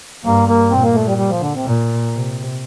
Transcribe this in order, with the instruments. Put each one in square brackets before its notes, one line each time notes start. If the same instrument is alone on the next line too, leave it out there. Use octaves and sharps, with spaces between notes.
[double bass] G2 [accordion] A#3
[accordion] A#3
[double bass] A#2 [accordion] C4
[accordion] A#3
A3
G3
G3
F3
D3
C3
[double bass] A#2
C3